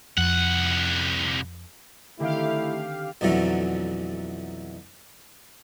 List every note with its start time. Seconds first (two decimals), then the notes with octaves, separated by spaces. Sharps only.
0.17 C2 F2 F#5
2.20 D3 D#3 A3 C4 E4 G4 F5
3.21 B1 F2 D3 E3 F#3 A3